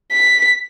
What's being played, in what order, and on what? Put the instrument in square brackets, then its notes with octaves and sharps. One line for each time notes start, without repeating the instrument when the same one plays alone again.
[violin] B6